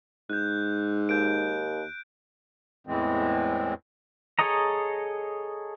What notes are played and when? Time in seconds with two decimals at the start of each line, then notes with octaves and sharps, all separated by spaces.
0.30 G#2 F#6 G6
1.09 D#2 G6 D7
2.87 E2 A2 E3 G#3 C4
4.39 G#4 A4 C#5 D#5 A#5